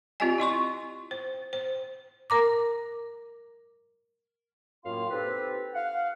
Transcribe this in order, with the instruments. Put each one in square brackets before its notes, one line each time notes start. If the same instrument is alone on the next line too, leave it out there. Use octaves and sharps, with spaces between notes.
[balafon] C4 F4 G4 D5 D#5 G#5
E4 D#5 C6 C#6
C5
C5
[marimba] A#4 A#5 D6
[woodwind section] F#2 A2 A#3 F4 F5 C6
C4 D#4 G4 A4 B4
F5 F#5